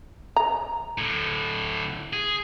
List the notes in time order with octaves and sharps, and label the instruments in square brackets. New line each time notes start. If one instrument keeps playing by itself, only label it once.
[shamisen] A#5
[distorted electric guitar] A2 D3
G#4